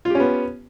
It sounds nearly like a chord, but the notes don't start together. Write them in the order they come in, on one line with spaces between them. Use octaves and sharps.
F4 G4 C#4 B3